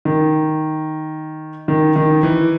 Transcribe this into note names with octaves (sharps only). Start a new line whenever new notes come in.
D#3
D#3
D#3
E3